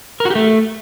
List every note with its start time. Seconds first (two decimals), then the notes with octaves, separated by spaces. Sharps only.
0.20 A#4
0.25 F#4
0.30 G4
0.35 A3